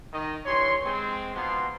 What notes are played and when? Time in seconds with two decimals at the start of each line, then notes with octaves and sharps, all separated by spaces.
0.13 D#3 D#5
0.46 G2 E3 C#5 C6
0.85 G#3 C4 C6
1.35 G#2 B2 F3 B3 A#5 C6